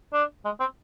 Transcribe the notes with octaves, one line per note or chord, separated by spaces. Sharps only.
D4
G#3
C4